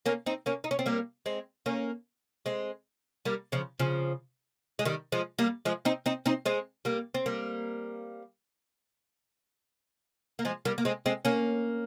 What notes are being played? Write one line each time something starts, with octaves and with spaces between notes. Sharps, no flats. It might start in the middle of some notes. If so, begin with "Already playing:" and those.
A#3 C#4
C4 D#4
A#3 C#4
D#4
C#4
C4
G3 A#3
G#3 C4
A#3 C#4
G#3 C4
G3 A#3
C#3 F3
C#3 F3
G#3
D#3 G3
F3 G#3
G3 A#3
F3 G#3
C4 D#4
C4 D#4
C4 D#4
G#3 C4
G3 A#3
C4
G3 A#3
A#3
F3 G#3
G3 A#3
A#3
G#3 C4
G#3 C4
A#3 C#4